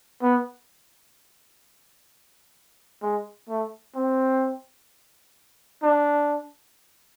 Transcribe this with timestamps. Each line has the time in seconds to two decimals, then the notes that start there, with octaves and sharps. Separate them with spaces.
0.22 B3
3.02 G#3
3.49 A3
3.96 C4
5.83 D4